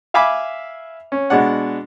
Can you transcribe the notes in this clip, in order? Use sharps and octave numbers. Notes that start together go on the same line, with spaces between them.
E5 F5 G#5 B5 D6
C#4
B2 G#3 D4 F#5